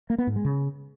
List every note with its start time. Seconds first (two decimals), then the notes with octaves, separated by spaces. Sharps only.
0.10 A#3
0.18 B3
0.27 G#2
0.36 G#3
0.45 C#3